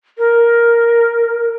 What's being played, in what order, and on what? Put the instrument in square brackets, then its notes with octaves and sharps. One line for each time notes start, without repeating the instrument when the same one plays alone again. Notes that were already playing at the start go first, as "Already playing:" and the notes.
[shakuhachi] A#4